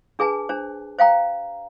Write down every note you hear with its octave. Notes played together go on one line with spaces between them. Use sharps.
D4 G#4 B4 G#5 A5
D4 C5
C5 F5 G5 A#5